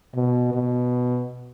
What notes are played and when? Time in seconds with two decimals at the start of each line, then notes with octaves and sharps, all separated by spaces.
0.15 B2
0.54 B2